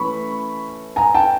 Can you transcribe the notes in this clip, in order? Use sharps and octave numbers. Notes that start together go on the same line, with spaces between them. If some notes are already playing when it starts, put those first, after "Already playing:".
Already playing: E3 A3 C#4 B5 C#6
G#5 A#5
G5 A5